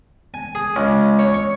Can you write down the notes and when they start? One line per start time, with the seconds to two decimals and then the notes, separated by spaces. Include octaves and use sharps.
0.34 G#5
0.55 G#4
0.76 C#2
1.19 C#5
1.34 C#6